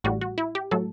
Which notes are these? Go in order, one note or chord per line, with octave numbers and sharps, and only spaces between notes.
A1 A2 G3 F#4
F#4
E4
G4
A2 F#3 A4